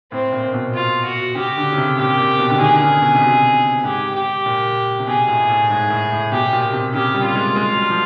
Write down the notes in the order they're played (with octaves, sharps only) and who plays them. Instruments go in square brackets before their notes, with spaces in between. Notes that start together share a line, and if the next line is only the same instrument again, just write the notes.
[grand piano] A2 [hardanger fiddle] C4
[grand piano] A#2
B2
[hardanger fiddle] F4
F#4
[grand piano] C#3 [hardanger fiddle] G4
[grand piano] D3
C#3
C3
[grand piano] A#2 [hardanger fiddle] G4
[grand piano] A#2
B2
D3
[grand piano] D#3 [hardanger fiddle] G#4
[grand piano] D3
C#3
B2
C3
B2
[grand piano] G#2 [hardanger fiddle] G4
[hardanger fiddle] G4
[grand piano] A#2
C3
[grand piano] B2 [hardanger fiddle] G#4
[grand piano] A2
A2
G#2
A2
A2
[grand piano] B2 [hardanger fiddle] G4
[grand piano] A#2
C3
[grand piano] C#3 [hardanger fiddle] G4
[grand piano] G3
[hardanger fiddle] F4
[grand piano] G#3
G#3
F#3
G3
F3